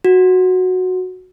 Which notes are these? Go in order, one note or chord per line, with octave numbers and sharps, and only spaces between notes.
F#4